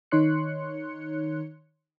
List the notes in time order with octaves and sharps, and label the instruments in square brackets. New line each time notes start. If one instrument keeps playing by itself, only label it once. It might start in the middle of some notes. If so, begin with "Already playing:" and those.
[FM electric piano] D#3 D#4 C#5 C6 F#6 C#7